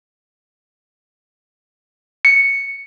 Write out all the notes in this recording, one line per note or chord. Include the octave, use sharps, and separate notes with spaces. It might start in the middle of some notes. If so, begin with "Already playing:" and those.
C#7